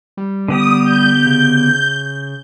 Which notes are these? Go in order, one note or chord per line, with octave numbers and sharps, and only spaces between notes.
G3
D3 B3 G4 D#6
G6
C#3